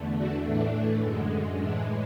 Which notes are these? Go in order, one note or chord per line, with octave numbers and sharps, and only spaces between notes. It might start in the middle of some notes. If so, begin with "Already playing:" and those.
Already playing: E2 D3 A3
D4 F#4
A2 E3 A3 D4
F#2 D3 G#3
A2 E3 G#3 D4